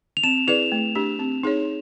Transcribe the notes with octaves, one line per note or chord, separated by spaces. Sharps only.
F7
C4 E7
E4 G#4 B4 D5 F7
A3
D4 G4
C4
D#4 G#4 C#5